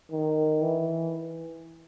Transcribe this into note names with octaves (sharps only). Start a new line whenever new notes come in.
D#3
E3